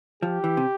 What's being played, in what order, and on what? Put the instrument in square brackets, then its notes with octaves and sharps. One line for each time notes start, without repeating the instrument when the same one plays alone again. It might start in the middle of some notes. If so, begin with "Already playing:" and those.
[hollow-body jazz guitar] F3 [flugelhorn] G4
[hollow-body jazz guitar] E3
C3